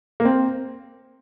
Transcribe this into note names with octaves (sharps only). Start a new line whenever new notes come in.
A#3
C4